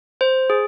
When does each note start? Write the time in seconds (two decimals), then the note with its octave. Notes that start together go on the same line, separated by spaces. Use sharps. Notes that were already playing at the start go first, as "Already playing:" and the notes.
0.21 C5
0.50 G#4